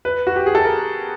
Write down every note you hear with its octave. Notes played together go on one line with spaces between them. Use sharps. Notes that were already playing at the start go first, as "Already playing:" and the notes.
B4
F#4
G4
G#4
A4
A#4